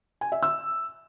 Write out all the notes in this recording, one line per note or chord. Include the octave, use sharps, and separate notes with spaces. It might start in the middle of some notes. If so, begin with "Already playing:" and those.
G#5
E5
E6